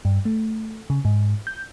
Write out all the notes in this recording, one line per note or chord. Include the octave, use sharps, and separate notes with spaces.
G2
A3
C#3
G#2
G6